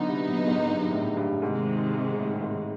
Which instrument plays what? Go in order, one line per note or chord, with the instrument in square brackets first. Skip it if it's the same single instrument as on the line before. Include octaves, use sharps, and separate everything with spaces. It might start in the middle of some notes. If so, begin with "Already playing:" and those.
Already playing: [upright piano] D3 [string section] F#3 B3 D#4
[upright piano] C3
A#2
G#2
G2
A2
G2
[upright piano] G#2 [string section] C3 D#3 G#3
[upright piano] A2
G#2